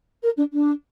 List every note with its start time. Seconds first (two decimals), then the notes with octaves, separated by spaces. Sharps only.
0.23 A#4
0.38 D4
0.53 D4